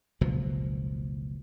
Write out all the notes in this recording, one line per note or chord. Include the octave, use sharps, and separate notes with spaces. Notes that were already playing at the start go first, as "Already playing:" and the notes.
F#1 C#2 B2 F3